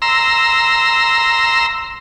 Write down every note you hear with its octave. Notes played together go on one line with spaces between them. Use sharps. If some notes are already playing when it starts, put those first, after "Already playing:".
A#5 C6 E6